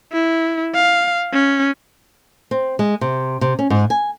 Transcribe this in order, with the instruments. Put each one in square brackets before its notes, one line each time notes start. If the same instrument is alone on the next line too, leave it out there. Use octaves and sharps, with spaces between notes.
[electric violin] E4
F5
C#4
[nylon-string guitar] C4
G#3
C3
C3
C#4
G#2
G#5